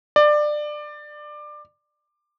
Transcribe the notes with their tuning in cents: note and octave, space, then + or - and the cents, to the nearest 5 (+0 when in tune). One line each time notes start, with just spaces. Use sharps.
D5 +20